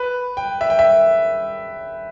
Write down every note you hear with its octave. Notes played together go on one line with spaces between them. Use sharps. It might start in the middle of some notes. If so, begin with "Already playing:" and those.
Already playing: B4
G5
E5
G5
E5